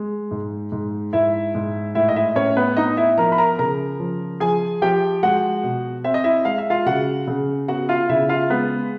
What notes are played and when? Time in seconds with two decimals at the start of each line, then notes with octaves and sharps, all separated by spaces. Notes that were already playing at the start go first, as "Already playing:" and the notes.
Already playing: G#3
0.31 G#2
0.72 G#2
1.13 G#2 E4 E5
1.55 G#2
1.95 A2 E4 E5
2.09 D#5
2.16 E4 E5
2.36 A2 C#4 C#5
2.57 B3 B4
2.77 B3 D#4 D#5
2.97 E4 E5
3.17 F3 A#4 A#5
3.32 B5
3.38 A#4 A#5
3.59 C#3 A#4 A#5
4.00 F3
4.40 F3 G#4 G#5
4.82 F3 G4 G5
5.23 G#3 F#4 F#5
5.64 B2
6.04 C4 E5
6.14 D#5
6.24 E4 E5
6.45 G#3 F5
6.58 E5
6.70 F4 F5
6.86 C#3 F#4 F#5
7.27 C#3
7.68 B3 F#4 F#5
7.89 F4 F5
8.09 C#3 E4 E5
8.29 F4 F5
8.50 G#3 B3 B4